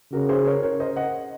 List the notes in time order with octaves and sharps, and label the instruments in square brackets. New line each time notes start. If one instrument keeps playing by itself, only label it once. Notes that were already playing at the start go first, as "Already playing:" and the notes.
[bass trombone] C#3 [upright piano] F#4 A#4
[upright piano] G#4 C5
A#4 C#5
A#4 C#5
C5 D#5
D#5 F#5